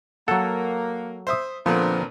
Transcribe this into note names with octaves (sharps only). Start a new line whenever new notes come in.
F#3 A#3 A4 F#5
C5 E5 D#6
A#2 D3 F3 B3 C4 D4 A#4